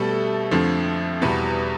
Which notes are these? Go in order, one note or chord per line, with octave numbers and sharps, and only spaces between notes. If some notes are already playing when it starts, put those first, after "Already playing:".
Already playing: B2 G3 A3 A4
F2 D3 F3 A3
E2 B2 G3 B3 B4